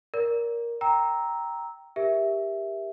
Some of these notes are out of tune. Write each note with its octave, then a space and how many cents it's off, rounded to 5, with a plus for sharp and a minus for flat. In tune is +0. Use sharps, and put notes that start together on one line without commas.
A#4 +10 D5 -30
G5 +0 A#5 +0 E6 -15
G4 +15 A#4 +25 E5 +0